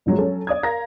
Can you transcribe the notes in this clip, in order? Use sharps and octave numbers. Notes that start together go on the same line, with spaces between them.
G1 A2 F3 F#3 G#3
F#3 C#4 A4
D5 D#6 G#6
A#4 F5 A#5 A#6